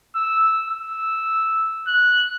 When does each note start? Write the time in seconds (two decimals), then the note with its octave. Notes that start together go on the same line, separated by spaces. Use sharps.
0.16 E6
0.69 E6
1.87 F#6